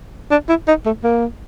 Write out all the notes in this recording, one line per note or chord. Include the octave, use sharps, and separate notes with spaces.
D4
E4
D#4
A3
A#3